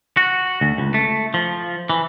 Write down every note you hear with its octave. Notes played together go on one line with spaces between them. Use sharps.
F#4
D2
C#2
A3
F3
E3